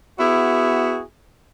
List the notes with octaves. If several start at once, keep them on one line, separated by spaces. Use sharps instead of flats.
B3 E4 F#4 G#4